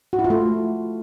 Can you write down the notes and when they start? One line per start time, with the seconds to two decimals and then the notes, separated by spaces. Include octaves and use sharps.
0.13 F#4
0.19 E4
0.24 F4
0.30 A3